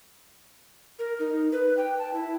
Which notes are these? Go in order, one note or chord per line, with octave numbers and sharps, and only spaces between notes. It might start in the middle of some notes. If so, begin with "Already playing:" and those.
A#4
D#4
B4
G5
A5
E4